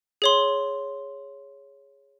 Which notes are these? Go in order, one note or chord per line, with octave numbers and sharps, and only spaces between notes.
G#4 C#5 C6